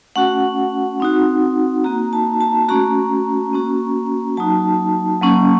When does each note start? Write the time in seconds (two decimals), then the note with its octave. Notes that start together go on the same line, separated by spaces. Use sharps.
0.16 A3 C#4 F#4 F#5
1.00 C4 D#4 F#4
1.84 A#3 D#4 F#4 A#5
2.13 A5
2.41 A5
2.69 A3 C#4 F#4 A#5
3.53 A#3 C#4 F#4
4.37 F#3 A#3 D#4 F#4 A5
5.21 F#3 A#3 C#4